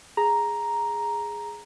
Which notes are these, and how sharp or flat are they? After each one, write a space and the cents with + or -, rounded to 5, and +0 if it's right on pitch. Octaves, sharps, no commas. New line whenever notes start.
G#4 +0 A#5 +5